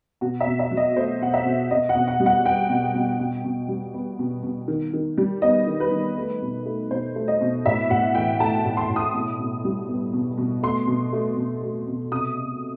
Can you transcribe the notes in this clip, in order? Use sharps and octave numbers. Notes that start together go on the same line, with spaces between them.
B2 F#4
E5
B2
E5
F#3
D#5
A3 C5
B2 F#5
E5
B2
B2 D#5
F#5
B2
F#5
G3
F#5
B3 G5
B2
B2
B2
B2
G3
B3
B2
B2
D#3
D#3
G3
B3 D#5
D#3
B4
D#3
A3
B2
A3
B2 C5
A3
D#5
B2
A2 E5
A2 F#5
E3 G5
A3 A5
A2
C6
A2
D#6
B2
B2
G3
B3
B2
B2
A3 C6
B2
A3
B2
A3
B2
C3 D#6
C3